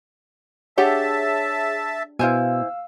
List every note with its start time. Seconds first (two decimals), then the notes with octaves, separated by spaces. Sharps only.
0.78 D4 G4 G#4 C#5 E5 F#5 A5
2.19 B2 E4 C5 F5 G#5 E6